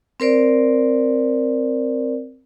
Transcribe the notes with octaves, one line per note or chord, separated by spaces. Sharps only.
C4 A#4 C5 D5